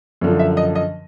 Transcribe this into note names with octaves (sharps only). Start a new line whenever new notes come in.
F#2 D3 F3
E5
D#5
D#5